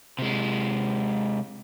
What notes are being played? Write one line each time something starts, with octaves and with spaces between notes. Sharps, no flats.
C3 G#3